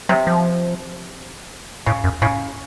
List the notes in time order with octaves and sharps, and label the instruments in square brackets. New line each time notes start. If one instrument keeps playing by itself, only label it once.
[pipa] C3 [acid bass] F#3
[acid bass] F3
[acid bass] A2 [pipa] C#3
[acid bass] F#2
[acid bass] A2 [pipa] C#3